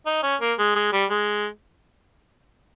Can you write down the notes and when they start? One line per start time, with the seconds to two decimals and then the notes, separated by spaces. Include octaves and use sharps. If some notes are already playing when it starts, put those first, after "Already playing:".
0.06 D#4
0.23 C#4
0.41 A#3
0.59 G#3
0.75 G#3
0.93 G3
1.10 G#3